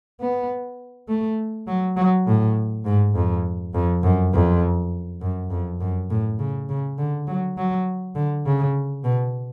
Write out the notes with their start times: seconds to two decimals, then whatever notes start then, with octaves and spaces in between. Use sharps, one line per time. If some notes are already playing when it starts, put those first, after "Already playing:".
0.20 B3
1.08 A3
1.67 F#3
1.97 F#3
2.27 A2
2.85 G#2
3.15 F2
3.74 F2
4.03 F#2
4.33 F2
5.21 F#2
5.50 F2
5.80 F#2
6.10 A2
6.39 C#3
6.69 C#3
6.98 D3
7.27 F#3
7.57 F#3
8.15 D3
8.46 C#3
9.04 B2